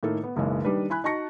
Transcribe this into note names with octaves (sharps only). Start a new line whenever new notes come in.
A2 D#3 A3 A#3 A4
B3
F#1 B1 C#3 E3 G#3
D#3 G3 D4 B4
E4 G#5 B5 F#6
D#4 F#4 A5 C#6 A#6 C#7